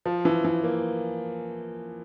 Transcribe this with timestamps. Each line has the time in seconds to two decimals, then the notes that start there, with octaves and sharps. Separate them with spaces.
0.06 F3
0.25 E3
0.45 E3
0.64 A#3